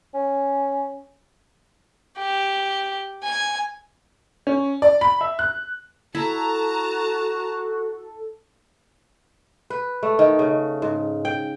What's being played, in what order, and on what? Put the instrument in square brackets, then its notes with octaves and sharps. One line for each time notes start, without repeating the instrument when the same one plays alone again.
[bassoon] C#4
[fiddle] G4
G#5
[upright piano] C#4
D5
B5
E5
F#6
[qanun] E4 [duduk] F#4 [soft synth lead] A4 [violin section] A5 A#5
[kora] B4
A3
D#3
C#3
G#2
G5